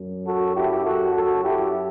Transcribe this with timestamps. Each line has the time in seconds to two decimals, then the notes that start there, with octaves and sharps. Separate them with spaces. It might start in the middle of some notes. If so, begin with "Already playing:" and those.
Already playing: F#2 F#3
0.26 F#4 A4
0.56 E4 G4
0.85 F#4 A4
1.15 F#4 A4
1.44 E4 G4